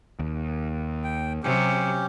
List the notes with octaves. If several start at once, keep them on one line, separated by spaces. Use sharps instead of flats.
D#2
G5
C3 F#3 C#4 G4